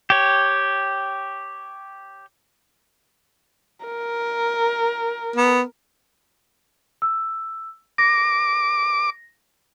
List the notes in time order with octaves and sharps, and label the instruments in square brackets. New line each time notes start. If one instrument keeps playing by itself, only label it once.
[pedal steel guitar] G4 C#5
[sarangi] A#4
[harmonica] B3
[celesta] E6
[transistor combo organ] D6 [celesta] A#6